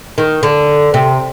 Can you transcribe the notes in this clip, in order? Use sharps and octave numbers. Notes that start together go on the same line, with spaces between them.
D#3
D3
C3